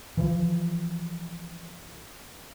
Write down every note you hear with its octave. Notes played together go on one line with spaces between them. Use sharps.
E3 F3